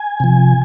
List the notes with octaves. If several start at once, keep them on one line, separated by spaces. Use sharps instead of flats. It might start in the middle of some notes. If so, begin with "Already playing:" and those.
Already playing: G#5
C3 F3